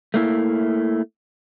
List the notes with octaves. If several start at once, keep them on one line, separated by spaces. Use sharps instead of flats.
A3 A#3 E4